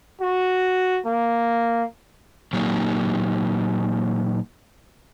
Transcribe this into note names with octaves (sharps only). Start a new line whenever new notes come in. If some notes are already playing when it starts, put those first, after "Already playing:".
F#4
A#3
A#2 F#3 A#3 D#4 G4